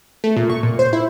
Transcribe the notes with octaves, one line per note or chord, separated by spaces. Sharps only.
A3
A#2
C#6
A#2
C5
E4